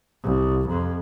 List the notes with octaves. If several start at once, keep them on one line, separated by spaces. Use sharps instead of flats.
C2
F2